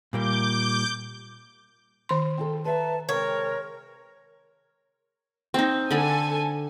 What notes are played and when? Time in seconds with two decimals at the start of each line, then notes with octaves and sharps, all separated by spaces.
0.13 A#2 G3 A#3 D6 G6
2.09 D#3 C6
2.37 C4 F4 A4
2.65 B4 E5 A5 A#5
3.09 C3 G#3 C4 A#4 C#5
5.54 C4 D#4
5.91 D3 D4 A4 G#5 B5